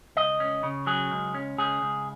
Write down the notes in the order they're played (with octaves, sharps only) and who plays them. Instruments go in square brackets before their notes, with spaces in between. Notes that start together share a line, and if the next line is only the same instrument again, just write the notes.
[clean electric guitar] C#2 D#5
C#4
C#3
F#3 G#4
C#2
C#4
C#2 G#4
C#2